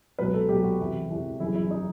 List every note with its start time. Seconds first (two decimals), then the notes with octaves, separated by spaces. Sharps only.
0.19 C#2 B2 F#3 B4
0.34 A4
0.49 C#2 B2 F#3 G4
0.64 F#4
0.80 E2 C3 E3
1.10 E2 C3 E3
1.40 G1 F#2 C#3 E3 E4
1.55 E4
1.70 C#3 E3 D#4